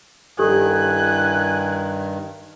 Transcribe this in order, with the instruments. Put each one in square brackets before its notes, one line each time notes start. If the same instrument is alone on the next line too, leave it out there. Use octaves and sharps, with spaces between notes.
[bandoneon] G2 D#3 [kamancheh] E4 F#6 [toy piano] G4 A4 [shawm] G#5